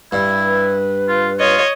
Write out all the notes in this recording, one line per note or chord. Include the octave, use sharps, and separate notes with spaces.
G2 E4
B4
F4
F4 C#5 D#5